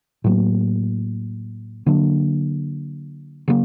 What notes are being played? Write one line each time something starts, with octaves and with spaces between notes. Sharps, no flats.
A2 F#3 A#3
D3 F#3 A#3 D4
C#3 F#3 A#3